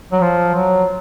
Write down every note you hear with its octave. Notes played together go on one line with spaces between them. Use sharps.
F#3
F3
F#3